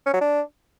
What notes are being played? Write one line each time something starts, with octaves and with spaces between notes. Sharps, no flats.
C#4
F#3
D4